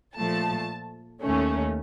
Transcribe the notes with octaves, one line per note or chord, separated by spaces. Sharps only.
A#2 F3 A3 A5
D#2 D#3 A3 C#4